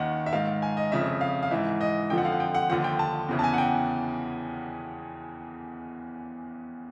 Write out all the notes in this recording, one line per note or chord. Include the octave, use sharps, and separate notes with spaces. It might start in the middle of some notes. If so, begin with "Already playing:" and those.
Already playing: D#2 D#3 F#5
E5
G#2 D#3 F5
G#5
D#5
F2 C#3 F3 E5
F5
F5
G#2 E3 E5
D#5
F2 D3 F3 G5
F#5
F5
F#5
G5
F#5
D#2 D3 F3 F#5
G5
A5
E2 C#3 E3
A5
G#5
F#5
G5